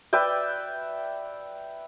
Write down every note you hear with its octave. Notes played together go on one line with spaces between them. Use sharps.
B4 D5 E5 G5